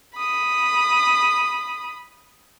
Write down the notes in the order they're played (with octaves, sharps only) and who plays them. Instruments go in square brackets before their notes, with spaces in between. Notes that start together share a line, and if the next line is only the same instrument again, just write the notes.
[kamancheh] B5 D#6